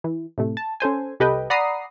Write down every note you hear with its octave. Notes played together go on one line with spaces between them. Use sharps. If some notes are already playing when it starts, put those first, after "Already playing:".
E3
A2 C3 A3
A5
C#4 A4 C5 G#5
C2 G4 A4 B4 D#5 G5
D5 F#5 A#5 B5 D#6 C7